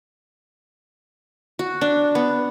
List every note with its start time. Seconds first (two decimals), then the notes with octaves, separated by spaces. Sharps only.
1.59 F#4
1.81 D4
2.15 B3